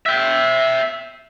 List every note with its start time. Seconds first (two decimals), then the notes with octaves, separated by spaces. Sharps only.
0.06 E5 G5